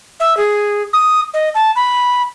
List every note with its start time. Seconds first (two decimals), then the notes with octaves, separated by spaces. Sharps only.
0.20 E5
0.37 G#4
0.93 D#6
1.34 D#5
1.55 A5
1.76 B5